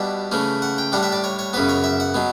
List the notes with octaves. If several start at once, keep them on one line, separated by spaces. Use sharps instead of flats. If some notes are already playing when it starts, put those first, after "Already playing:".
Already playing: B2 G3 D4 E5
C#3 E3 A3 C#4
F#5
G5
A2 G3 D4 F#5
E5
D5
C#5
C#5
F#2 C#3 E3 B3 B4
C#5
E5
F#5
B2 F#3 B3